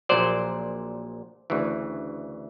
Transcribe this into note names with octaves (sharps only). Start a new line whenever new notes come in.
A#1 A#2 F#3 C5 D5
D2 C#3 E3